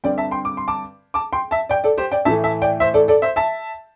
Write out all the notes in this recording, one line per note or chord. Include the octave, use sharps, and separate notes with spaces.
G2 D3 G3 C4 D5 G5
E5 A5
G5 C6
D6
C6
A5 D6
A5 D6
G5 C6
E5 A5
D5 G5
A4 D5
G4 C5
D5 G5
A2 E3 A3 E5 A5
E5 A5
D5 G5
C5 E5
A4 D5
A4 D5
C5 E5
E5 A5